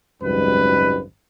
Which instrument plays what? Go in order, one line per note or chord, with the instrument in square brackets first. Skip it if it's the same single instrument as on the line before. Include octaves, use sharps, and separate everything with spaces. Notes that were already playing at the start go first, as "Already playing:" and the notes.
[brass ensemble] G#1 C#2 F#2 D#3 G3 B4